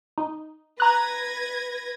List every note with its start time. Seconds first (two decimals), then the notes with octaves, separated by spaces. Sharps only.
0.18 D#4
0.80 B4 A#5 F#6 G#6 A#6